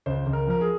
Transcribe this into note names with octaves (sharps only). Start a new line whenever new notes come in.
C#2 C5
C#2
A#4
F3 A#4
G#4